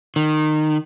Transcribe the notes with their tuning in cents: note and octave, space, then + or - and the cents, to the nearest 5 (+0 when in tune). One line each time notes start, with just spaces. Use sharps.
D#3 -20